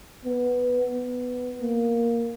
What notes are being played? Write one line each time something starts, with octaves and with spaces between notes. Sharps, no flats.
B3
B3
A#3